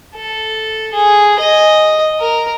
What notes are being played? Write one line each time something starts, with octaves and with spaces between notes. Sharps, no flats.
A4
G#4
D#5
A#4